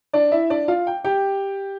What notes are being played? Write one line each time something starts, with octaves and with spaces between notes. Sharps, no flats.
D4 D5
E4 E5
D4 D5
F4 F5
G5
G4 G5